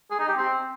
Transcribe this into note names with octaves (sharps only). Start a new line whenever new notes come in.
G#4
D#4
G4
C4